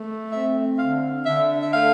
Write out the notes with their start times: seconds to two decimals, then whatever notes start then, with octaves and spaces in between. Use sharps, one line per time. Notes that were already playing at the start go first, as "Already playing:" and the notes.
Already playing: A3
0.32 C4 E5
0.79 D3 F5
1.26 D3 E5
1.63 E5
1.73 A3 F5